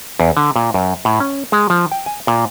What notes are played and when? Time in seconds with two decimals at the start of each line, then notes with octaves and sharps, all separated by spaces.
0.19 E2
0.37 D3
0.56 A#2
0.74 F#2
1.05 A2
1.20 C#4
1.52 G#3
1.70 F3
1.91 G5
2.06 G#5
2.27 A#2